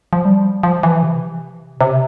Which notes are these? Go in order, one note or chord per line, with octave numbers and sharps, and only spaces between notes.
F3
G3
F3
E3
C3
C3